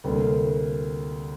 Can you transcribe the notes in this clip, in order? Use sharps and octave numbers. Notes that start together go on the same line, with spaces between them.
D2 C3 G3 A#3